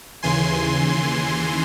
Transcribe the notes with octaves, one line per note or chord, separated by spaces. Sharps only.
D#2 C#3 E3 G#5 C6